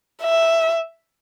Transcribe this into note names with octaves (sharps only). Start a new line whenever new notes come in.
E5